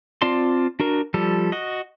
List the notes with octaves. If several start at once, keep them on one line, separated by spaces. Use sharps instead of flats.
C4 F4 D5 A5 C6
D4 F#4 A#4
F3 G3 A4
F#4 D#5